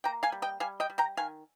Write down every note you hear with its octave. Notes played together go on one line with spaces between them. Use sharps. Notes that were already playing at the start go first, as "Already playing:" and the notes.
A#3 G5 A#5
F5 G#5
G3
D#5 G5
G3 F5 G#5
D#5 G5
G3
G5 A#5
D#3 F5 G#5